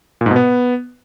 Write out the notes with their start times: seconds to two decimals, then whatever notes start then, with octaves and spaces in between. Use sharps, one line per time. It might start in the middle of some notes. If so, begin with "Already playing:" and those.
0.21 A#2
0.26 G#2
0.31 B2
0.36 B3